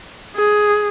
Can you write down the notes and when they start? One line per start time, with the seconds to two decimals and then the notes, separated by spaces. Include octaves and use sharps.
0.36 G#4